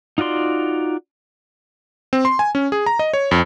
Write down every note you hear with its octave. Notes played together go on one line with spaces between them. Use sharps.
D#4 F4 F#4 D5 C6
C4
C6
G#5
C#4
G#4
A#5
D#5
C#5
F2